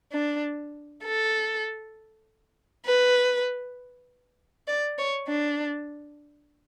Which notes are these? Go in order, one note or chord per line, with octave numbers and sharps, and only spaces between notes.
D4
A4
B4
D5
C#5
D4